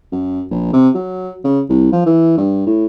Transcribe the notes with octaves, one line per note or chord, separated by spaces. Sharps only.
F#2
A#1
C3
F#3
C#3
C2
F3
E3
G2
A2